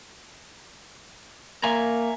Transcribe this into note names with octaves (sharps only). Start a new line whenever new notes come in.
A#3 E5 G#5 A#5